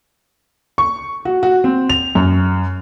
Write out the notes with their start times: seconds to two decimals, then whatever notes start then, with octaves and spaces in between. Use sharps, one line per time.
0.78 C#6
1.25 F#4
1.43 F#4
1.64 C4
1.90 F7
2.15 F#2